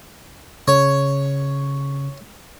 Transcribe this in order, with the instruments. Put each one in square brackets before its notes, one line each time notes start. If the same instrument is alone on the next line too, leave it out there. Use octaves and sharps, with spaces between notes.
[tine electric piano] C#3 [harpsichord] C#5